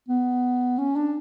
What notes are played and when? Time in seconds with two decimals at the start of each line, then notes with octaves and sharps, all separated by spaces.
0.08 B3
0.78 C#4
0.96 D4